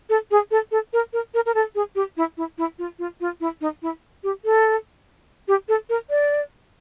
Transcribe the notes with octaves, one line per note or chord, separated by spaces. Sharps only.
A4
G#4
A4
A4
A#4
A#4
A#4
A#4
A4
G#4
G4
E4
E4
E4
F4
F4
F4
E4
D#4
E4
G4
A4
G4
A4
A#4
D5